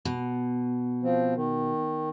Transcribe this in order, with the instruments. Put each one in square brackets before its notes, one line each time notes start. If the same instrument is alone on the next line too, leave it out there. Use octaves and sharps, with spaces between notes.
[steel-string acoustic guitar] B2
[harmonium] F3 C4
D#3